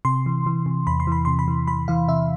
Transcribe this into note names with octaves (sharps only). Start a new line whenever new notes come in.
C3 C6
E3
E3
C3
E2 B5
C6
E3 B5
C3 C6
B5
E3
E3 B5
E3 F5
C3 E5